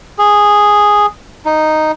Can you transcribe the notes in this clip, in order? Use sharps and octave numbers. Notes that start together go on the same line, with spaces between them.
G#4
D#4